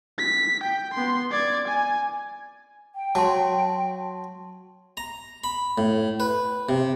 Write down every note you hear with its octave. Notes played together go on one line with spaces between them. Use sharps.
B6
G5
B3 C6
D5 G#6
G#5
G5
F#3 A5 C6
A#5
B5
A2
B4
C3